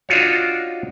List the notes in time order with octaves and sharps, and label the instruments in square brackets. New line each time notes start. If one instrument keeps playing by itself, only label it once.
[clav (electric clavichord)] D4 D#4 F4 F#4 C#5